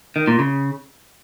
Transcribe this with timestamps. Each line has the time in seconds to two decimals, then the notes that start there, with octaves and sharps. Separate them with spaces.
0.16 D#3
0.28 A#2
0.39 C#3